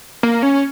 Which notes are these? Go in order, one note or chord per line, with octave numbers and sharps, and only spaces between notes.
A#3
C#4